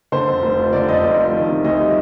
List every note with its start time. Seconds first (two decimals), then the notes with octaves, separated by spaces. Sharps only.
0.12 D3 C5
0.28 F2
0.42 F1
0.57 F3
0.73 D3 D5
0.88 F2 D#5
1.04 F1
1.18 F3
1.34 D#3
1.49 C3
1.64 D2 D#5
1.80 G3